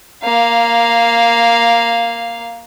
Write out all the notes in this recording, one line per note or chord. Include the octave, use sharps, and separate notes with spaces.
A#3 F5